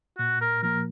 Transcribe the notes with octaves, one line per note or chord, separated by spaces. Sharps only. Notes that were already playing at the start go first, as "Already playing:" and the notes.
A#2 F#4
A#4
F3 A#3 A#4